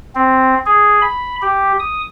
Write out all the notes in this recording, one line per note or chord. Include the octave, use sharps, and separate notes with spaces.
C4
G#4
B5
G4
D#6